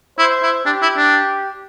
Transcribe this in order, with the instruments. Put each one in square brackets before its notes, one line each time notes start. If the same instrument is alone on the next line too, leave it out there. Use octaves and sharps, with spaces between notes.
[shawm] E4 [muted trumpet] C5
[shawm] E4
[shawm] D4 [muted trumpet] G4
[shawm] E4
D4